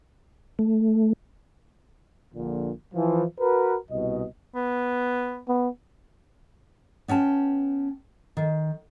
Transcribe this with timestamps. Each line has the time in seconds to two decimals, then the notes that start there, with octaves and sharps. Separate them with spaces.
0.59 A3
2.35 A#1 A#2 D3
2.94 E3 F3
3.40 F#4 A#4 B4
3.91 C2 B2 D#5
4.55 B3
5.48 B3
7.08 B3 C#4 G5 A5
8.37 D#3